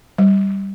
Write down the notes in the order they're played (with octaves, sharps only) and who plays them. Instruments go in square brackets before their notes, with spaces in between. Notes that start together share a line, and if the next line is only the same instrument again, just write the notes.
[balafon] G3